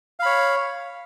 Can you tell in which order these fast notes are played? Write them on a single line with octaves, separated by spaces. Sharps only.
F5 B5 C#5